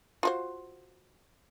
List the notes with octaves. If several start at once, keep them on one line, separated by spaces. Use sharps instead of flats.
F4 F#4 C5